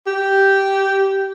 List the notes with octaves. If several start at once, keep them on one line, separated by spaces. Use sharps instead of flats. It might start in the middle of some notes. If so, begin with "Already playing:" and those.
G4